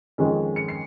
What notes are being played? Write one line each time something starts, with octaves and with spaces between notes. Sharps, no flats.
F2 D#3 G#3 C#4
C#7
C7